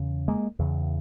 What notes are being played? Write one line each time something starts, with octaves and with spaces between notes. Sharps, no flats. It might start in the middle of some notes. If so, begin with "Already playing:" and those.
Already playing: E2 C#3
G#3 A#3
E2 C#3